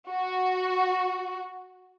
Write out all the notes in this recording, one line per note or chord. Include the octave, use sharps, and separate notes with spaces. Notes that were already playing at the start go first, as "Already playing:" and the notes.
F#4